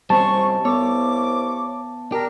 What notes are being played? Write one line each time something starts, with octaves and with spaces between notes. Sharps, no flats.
G3 C4 C#4 D#4 C5 A5 C#6
C2 B3 C#5 D6
D4 G4 A#4